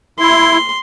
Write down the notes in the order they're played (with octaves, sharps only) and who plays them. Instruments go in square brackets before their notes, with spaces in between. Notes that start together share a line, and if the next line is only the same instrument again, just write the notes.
[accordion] E4 [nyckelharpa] C6